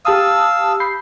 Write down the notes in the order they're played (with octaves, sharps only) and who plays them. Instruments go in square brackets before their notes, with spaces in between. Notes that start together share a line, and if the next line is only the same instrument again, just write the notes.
[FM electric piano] G4 A5 D#6 [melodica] F5 E6
[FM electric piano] B5 G6 C7